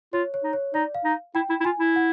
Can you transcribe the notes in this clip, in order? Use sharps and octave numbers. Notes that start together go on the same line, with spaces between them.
F4 C#5
C#5
D#4
C#5
D#4 D5
F5
D#4
E4 G5
E4
E4
F4 G#5
E4
F#5